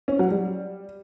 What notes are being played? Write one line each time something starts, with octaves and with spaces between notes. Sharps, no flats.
C#4
F#3
G3